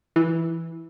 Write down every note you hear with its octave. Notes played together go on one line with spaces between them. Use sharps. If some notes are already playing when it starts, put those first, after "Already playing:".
E3